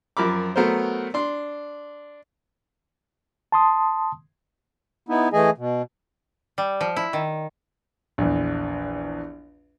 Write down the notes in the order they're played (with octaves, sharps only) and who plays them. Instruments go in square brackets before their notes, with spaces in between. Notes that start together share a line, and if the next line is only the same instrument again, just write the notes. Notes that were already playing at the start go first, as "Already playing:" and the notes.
[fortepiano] F#2 F3 A#4 B5 D6
F#3 A3 B3 A#4 C5
D4 C6
[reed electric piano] A5 C6 D#6
[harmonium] B3 D#4 E4
E3 A3 G#4 D#5 G#5
B2
[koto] G3
F3
E4
D#3
[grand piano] A#1 E2